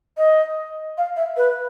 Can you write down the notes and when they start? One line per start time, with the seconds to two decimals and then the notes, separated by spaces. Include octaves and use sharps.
0.17 D#5
0.98 F5
1.17 E5
1.37 B4